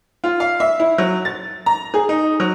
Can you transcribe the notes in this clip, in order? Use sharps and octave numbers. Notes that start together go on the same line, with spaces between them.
F4
F5
E5
E4
F#3
A6
A#5
G#4
D#4
F#3